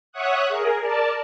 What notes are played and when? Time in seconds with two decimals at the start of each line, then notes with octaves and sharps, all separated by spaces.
0.12 C#5 E5 F#5 C#6 D#6 F#6
0.48 G#4 A#4
0.80 A#4 D5 A5